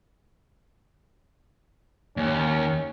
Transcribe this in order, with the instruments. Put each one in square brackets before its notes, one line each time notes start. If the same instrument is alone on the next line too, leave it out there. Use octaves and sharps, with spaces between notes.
[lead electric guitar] D#2 [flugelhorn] C#4